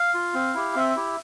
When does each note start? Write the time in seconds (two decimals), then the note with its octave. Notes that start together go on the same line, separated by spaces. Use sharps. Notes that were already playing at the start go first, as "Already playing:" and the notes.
Already playing: F5
0.14 F4
0.34 C4
0.54 E4 G4
0.75 C4 E5
0.96 E4 G4